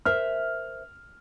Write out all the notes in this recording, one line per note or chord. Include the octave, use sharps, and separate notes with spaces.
A#4 C5 E5 F6